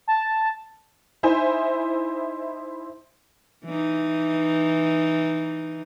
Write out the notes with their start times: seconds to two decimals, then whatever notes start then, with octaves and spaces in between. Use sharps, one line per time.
0.08 A5
1.23 D#4 E4 C5 E5 G#5
3.65 E3 D#4